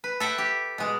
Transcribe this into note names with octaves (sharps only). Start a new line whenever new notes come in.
B4
A4 E5 F#5 G5
G4
B2 G#3